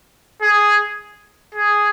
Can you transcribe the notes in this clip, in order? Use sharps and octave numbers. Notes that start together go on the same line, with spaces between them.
G#4
G#4